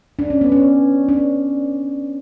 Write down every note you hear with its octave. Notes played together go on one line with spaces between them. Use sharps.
D4
C#4
B3
C#4
D4